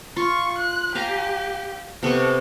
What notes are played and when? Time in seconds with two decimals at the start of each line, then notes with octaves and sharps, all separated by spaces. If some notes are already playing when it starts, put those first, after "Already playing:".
0.16 F4 C#6
0.58 F#6
0.95 G4 F5 G#5 A#5
2.03 C3 B3 A4 C#6